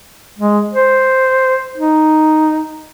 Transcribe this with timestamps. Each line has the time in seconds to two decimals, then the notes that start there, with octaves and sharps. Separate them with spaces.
0.39 G#3
0.73 C5
1.78 D#4